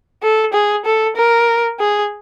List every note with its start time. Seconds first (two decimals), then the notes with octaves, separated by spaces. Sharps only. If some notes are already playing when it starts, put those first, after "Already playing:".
0.23 A4
0.53 G#4
0.85 A4
1.17 A#4
1.79 G#4